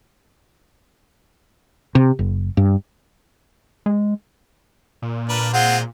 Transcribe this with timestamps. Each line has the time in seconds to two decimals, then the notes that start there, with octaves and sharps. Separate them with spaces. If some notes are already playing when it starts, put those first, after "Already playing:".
1.95 C3
2.19 F#1
2.57 G2
3.86 G#3
5.02 A#2
5.29 D4 A#4 B4
5.53 G#3 C4 F4 F#5